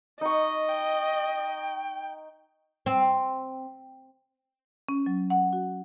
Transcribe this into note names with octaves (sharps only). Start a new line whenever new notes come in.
D#4 D#5 C#6
G5
C4
C#4
F#3
F#5
F#4